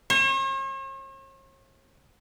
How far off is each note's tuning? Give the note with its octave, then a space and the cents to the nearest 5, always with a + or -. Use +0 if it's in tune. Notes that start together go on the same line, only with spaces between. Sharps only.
C#5 -45